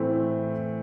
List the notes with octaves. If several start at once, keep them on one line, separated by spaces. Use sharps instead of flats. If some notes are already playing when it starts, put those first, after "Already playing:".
Already playing: A2 E3 A3 C4